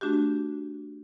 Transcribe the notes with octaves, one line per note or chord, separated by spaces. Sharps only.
A3 D4 F#4 G4